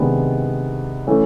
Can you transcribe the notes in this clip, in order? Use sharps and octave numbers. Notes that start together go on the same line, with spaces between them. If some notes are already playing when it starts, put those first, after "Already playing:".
Already playing: C3 D#3 G#3 B3 D4
E3 A3 C#4